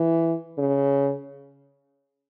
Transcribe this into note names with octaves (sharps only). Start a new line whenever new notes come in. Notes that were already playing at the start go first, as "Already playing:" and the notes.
Already playing: E3
C#3